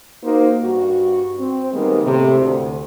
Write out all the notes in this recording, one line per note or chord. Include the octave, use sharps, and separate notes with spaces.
A#3 D#4 F#4 C5
G2 F#4
C4
D#3 G3 G#3 A#3 B3
A2 C3
D2